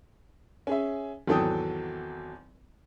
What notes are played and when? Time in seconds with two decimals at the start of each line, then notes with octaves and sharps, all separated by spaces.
0.67 C#4 G#4 E5
1.27 G#1 E2 F#3 A4 G5 D#6